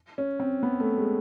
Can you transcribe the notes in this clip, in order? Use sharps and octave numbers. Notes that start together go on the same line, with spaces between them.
C#4
C4
B3
A3
G#3